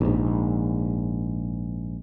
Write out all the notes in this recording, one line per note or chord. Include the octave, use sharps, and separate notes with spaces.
A#1 G#2